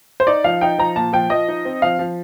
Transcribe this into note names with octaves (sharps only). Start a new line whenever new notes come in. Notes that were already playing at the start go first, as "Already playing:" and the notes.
C5
D#4 D5
F3 F5
D#4 G5
F3 A#5
A#2 A5
F3 G5
F3 D#5
D#4
C4
F3 F5
F3